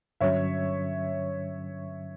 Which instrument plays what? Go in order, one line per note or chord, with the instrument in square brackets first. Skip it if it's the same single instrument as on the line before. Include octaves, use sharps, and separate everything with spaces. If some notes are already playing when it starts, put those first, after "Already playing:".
[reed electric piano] G2 D3 F#3 C#4 [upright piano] C#5 E5